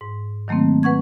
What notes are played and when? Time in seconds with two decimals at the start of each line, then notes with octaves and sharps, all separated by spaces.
0.01 G#2
0.48 D#3 F#3 A3 A#3 C4
0.83 B4 F#5 C#6 G#6